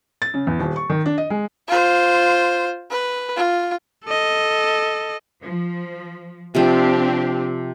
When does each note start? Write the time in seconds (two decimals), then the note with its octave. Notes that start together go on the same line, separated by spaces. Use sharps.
0.22 A6
0.34 C#3
0.47 E2
0.60 D#1
0.76 C#6
0.90 D#3
1.06 D4
1.18 D#5
1.30 G#3
1.68 F4 C5
2.91 B4
3.36 F4
4.05 A4 D#5
5.43 F3
6.55 C3 F3 C4 D4 G4